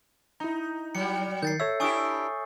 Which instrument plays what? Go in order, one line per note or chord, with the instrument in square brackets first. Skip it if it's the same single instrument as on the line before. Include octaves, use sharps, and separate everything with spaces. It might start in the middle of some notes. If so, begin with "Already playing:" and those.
[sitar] D#4 [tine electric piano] E4 A#5
[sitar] F#3 G3 [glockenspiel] C#7
[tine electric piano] D#3 [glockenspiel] G6 A6 C7
[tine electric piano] A4 C#5 E5 [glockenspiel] E6
[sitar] D4 E4 G4 [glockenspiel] G#5 C#6 D#6